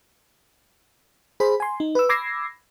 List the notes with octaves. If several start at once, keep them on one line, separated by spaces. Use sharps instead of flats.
G#4 C5 B5
G#5 C6
D#4
B4 E6
B5 D6 E6 G#6 A#6 C7